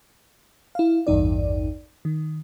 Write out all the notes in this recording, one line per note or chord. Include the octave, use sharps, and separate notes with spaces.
E4 F5
A1 E2 G2 D#4 D5
D#3